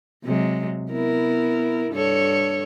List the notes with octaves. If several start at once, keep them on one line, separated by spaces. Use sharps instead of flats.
C3 F#3 G#3
B3 E4 A#4
G2 A4 C#5